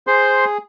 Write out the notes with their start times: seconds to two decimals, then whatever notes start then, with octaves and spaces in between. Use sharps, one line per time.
0.07 G#4 C5 C6